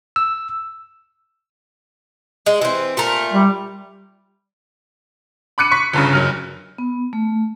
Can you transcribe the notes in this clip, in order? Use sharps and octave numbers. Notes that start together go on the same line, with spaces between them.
E6
G#3
E3 C4
A#2 A3 A#4
G3
B5 D6 F#6 C#7 D#7
C#6 B6
G1 G2 C#3
F#1 F#3 F6
B3
A3